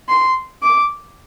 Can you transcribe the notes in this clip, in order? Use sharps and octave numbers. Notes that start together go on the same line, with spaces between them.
C6
D6